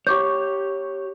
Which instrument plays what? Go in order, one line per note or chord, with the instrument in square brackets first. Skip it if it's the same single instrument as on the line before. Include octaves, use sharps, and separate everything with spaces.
[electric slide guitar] G4 C#5 [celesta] C#6 D6 G6